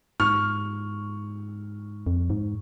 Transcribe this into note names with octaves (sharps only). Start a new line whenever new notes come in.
G#2 C#6 F6
F2
G#2